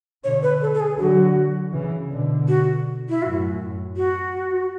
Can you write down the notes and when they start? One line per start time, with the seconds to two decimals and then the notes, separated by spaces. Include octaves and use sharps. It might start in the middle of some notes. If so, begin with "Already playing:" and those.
0.24 B2 D3 C#5
0.43 B4
0.62 A4
0.74 A4
0.80 G#4
0.99 D3 F#3 F#4
1.73 C#3 E3
2.11 B2 D3
2.48 F#4
3.09 E4
3.22 F#2 A2 F#4
3.97 F#4